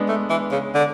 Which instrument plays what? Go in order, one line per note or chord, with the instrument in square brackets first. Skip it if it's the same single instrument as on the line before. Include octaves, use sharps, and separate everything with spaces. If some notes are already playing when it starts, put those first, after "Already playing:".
Already playing: [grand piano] G#3 B3 D4
[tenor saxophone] A3
E3
C#3
D3